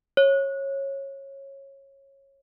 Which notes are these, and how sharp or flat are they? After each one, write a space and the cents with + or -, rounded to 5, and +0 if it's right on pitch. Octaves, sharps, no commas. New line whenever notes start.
C#5 -20